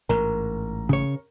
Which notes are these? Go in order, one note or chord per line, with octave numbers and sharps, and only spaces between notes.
A1 G#2 A#4
C#3 C#5